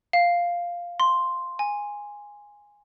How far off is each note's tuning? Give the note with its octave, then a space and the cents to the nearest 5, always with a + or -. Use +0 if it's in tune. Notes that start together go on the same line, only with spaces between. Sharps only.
F5 +0
C6 +0
G#5 -10